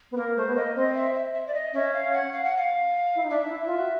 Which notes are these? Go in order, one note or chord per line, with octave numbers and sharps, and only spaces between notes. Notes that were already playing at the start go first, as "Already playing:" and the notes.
B3
A#3 A#4
A3 C5
B3
A#3 D#5
C4 D#5
E5
E5
E5
D5
D#5
C#4 E5
F5
F#5
F5
F#5
F5
E4
D#4
D4 E5
D#4
E4
F4
F#4